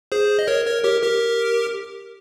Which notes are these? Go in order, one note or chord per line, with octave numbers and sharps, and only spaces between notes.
G#4 C5
D#5
A#4 C#5
A#4 C#5
G4 A#4
G4 A#4